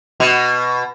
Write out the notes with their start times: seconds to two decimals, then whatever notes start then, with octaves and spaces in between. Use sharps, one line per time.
0.20 B2